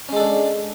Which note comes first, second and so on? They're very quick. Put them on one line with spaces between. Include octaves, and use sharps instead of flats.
C#4 G#3 A4 D4